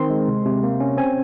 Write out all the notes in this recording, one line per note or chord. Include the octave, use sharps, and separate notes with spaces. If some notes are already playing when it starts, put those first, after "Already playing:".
Already playing: D#3 C4 C6
G#3
C3
C3
A#3
C#4
C4 G#5